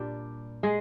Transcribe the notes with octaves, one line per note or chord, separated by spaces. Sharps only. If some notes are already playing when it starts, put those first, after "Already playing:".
Already playing: A#2 G3 D4 G4
G#3 G#4